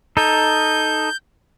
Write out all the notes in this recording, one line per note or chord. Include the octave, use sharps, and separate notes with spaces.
D#4 A4 G6